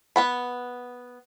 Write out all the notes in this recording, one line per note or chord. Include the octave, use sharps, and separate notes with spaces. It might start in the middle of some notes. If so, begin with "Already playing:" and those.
B3 F#5 B5